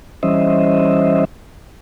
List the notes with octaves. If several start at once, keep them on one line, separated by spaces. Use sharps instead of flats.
E3 G3 C#4 C5 D#5 E5